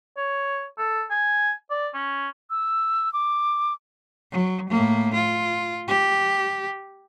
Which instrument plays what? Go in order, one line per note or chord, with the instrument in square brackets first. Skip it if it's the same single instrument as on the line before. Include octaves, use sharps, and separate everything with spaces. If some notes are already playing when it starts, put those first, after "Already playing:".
[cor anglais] C#5
A4
G#5
D5
C#4
[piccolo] E6
D6
[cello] F#3
A2 A#3
F4
G4